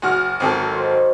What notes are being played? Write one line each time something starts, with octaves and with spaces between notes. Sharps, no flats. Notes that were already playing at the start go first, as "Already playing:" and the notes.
F#1 F#4 F6
G#1 F#3 C4 A4
D#3 C5